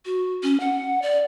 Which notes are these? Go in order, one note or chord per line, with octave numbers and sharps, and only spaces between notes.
F#4
C#4
F#5
D5